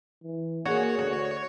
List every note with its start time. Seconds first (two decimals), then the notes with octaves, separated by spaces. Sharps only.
0.24 E3
0.66 A#3 F#4 G#4 C#5
0.99 D2 F#4